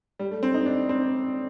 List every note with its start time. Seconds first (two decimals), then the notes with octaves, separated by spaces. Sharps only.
0.19 G3
0.31 A3
0.43 C4
0.54 D#4
0.66 D4
0.89 C4